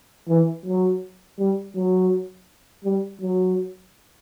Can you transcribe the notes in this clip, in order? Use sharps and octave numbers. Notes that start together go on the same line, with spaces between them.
E3
F#3
G3
F#3
G3
F#3